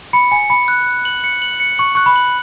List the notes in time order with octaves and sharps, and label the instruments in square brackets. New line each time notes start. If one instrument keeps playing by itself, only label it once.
[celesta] B5 [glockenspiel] C#7
[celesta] G#5 [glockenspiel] C#7
[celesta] B5 [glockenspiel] C#7
[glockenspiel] F#6
F#6
F#7
C#7
F#7
C#7
[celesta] C#6 [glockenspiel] F#7
[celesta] C#6 [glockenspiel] F#6
[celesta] B5
[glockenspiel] F#7